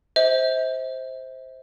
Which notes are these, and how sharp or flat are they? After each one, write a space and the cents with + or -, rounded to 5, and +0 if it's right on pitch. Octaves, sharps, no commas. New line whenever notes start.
C5 +0 E5 -40